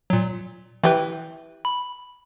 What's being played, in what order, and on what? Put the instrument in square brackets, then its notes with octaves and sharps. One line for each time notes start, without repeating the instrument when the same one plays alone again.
[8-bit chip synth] A#2 F#3
[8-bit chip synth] E3 B4 [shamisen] E4 G4
[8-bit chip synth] B5